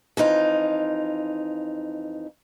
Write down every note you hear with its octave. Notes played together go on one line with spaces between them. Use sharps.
F2 E3 D#4 F4